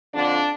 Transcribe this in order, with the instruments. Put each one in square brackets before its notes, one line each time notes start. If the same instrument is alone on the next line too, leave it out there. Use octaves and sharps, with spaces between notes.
[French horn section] F2 D3 D4